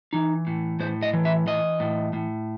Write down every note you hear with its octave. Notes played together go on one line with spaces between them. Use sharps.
E3 D#4
A2
A2 C5
D#5
E3
E5
E3 D#5
A2
A2